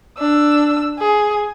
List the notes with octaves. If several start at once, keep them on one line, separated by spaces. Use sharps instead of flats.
D4 E6
G#4